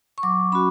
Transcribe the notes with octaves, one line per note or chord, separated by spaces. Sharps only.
C#6
F#3 D6
C#4 F#4 B5